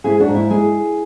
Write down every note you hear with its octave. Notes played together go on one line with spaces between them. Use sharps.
G#2 E4 G#4
D4 F#4
G#2
E4
G#3 E4 G#4